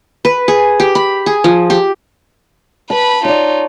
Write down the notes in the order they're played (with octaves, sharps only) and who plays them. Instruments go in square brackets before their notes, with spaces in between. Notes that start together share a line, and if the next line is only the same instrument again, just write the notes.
[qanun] B4
G#4
G4
B5
G#4
F3
G4
[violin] B4 B5 [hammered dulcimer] A5
[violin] D#4 F4 [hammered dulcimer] C#5 D5